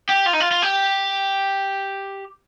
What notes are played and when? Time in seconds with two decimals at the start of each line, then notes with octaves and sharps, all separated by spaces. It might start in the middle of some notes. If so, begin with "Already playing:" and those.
0.09 G4
0.26 F4
0.33 D#4
0.40 F4
0.51 F4
0.62 G4